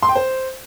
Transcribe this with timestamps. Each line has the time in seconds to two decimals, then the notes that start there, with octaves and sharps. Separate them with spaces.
0.03 C6
0.09 G5
0.15 C5